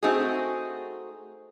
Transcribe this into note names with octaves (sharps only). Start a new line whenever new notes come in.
A3 C4 D#4 F#4 G#4